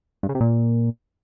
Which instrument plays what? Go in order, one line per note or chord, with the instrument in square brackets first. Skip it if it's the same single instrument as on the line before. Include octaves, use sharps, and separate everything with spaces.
[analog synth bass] G2
C#3
C3
A#2